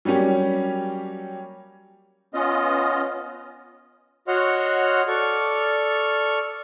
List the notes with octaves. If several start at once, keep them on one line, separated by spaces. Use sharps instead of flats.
F#3 G3 A#3 C#4 G4
B3 C#4 F4 D#5
F#4 C#5 D#5 F#5 C6 F6
A4 D5 C#6 F6